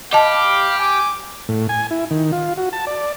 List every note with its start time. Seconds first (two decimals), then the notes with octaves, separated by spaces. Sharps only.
0.13 G4 D#5 F5 A5 B5 D6
0.79 G#5 D6
1.49 A2
1.69 G#5
1.91 E4
2.11 D#3
2.32 F4
2.57 F#4
2.73 A5
2.87 D5